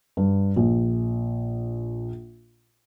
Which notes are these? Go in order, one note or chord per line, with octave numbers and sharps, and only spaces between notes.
G2
A#1